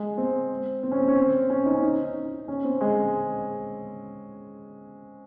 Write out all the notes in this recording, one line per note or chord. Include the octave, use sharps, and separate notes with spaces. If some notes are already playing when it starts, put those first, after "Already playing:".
Already playing: G#3
C4
C4
C#4
C4
C#4
C4
C#4
D#4
C#4
D#4
C#4
C4
G#3